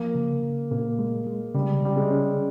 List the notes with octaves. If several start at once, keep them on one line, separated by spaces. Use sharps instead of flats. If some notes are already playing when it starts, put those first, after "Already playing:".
Already playing: F3 A#3
C#3
C#3
A#2 A#3
G#3
G#3
C#3 G3
C#3 G3
G#3
C#4